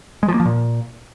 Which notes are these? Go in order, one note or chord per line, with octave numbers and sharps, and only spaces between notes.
G#3
F3
A#3
F3
A#2